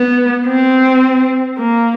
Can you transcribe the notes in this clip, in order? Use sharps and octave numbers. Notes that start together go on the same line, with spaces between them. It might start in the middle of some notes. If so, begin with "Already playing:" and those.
Already playing: B3
C4
A#3